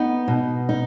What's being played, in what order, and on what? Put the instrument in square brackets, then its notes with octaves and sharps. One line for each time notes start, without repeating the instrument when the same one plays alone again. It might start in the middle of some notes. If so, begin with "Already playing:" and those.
Already playing: [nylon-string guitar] B3 [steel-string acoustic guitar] D#4
[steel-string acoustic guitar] B2
D#4